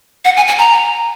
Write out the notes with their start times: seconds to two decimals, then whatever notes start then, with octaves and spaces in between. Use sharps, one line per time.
0.25 F#5
0.37 G#5
0.47 G#5
0.58 A#5